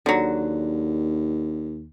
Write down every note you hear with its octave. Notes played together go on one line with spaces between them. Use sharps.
D#2 D3 F#3